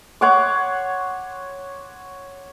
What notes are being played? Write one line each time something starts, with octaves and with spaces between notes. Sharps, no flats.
C#5 F#5 C6 D6